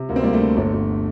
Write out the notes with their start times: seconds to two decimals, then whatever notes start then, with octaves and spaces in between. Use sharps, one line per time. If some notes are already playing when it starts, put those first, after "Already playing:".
Already playing: C3
0.09 D2 A#3
0.16 C4
0.23 D2 G3 A#3
0.33 A3
0.40 D3
0.57 G1 A3
0.73 G1